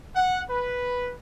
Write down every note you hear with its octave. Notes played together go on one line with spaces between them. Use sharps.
F#5
B4